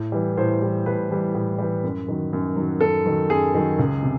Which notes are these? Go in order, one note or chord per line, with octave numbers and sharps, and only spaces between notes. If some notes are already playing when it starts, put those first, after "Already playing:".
Already playing: A2
E3 G3
A2 C5
E3 G3
A2 B4
E3 G3
A2
E3 G3
F#2
D#3 F#3
F#2
D#3 F#3
F#2 A4
D#3 F#3
F#2 G#4
D#3 F#3
C#2
C3